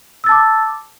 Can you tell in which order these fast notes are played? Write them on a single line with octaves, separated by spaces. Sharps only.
E6 A6 A5 D6